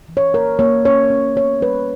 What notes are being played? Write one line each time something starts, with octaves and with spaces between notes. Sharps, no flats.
E3
C#5
A#3 A#4
A#3 C#5
C#4 C#5
C#4
B3 C#5
G3 B4